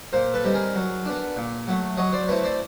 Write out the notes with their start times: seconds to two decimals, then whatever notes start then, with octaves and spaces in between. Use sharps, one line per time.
0.13 A#2 A#4 C5
0.34 A4 B4
0.44 G3 C4 D#4
0.54 G#4 A#4
0.75 F#3
1.05 B3 D4
1.36 A#2
1.67 F#3 A3
1.97 F#3 C#5 D#5
2.12 C5 D5
2.28 A3 C4 E4 B4 C#5
2.44 C5 D5